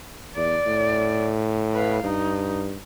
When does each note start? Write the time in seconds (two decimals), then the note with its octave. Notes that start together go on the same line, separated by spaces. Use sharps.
0.36 E2 D5
0.66 A2
1.74 B4 F5
2.04 G2 D#4